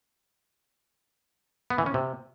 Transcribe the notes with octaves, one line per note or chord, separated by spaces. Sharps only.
B3
E3
C#4
C3